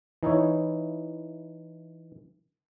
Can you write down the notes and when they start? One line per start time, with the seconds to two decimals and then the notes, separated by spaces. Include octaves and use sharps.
0.23 E3 D#4 E4 C#5